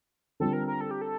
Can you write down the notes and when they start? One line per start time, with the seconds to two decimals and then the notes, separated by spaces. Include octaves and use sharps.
0.40 D3 G3 C4 F4 A4
0.53 A#4
0.67 A#4
0.81 A4
0.91 G4
1.01 A4